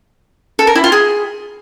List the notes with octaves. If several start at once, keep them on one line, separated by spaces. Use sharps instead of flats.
A4
A#4
E4
F4
G#4